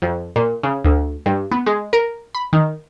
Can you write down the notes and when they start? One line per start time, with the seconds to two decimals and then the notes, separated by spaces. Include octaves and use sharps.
0.02 F2
0.36 A#2
0.63 C#3
0.85 D2
1.26 G2
1.51 B3
1.66 G#3
1.93 A#4
2.35 B5
2.53 D#3